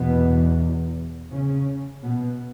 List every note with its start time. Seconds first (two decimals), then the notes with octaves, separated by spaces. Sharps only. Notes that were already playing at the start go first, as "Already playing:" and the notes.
Already playing: E2 B2 B3
1.30 C#3 C#4
2.03 B2 B3